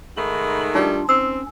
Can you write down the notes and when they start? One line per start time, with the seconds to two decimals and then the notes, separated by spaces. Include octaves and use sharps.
0.17 G#2 D#3 A3 B5
0.75 G3 D4 D#4 F4
1.09 C4 C#4 E6